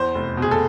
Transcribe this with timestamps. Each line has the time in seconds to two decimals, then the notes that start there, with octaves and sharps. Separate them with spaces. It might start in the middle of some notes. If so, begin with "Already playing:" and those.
Already playing: E2 C5
0.15 F1
0.37 B2
0.42 G#4
0.51 A4